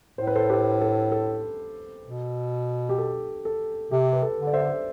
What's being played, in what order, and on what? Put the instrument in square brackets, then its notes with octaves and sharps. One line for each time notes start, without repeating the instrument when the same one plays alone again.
[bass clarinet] A2 [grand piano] C5
[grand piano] B4
A4 C5
G4 B4
A4
A4
[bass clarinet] B2
[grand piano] G4
A4
A4
[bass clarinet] C3 [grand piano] G4
[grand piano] B4
A4
[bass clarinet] D3
[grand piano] D5
C5 E5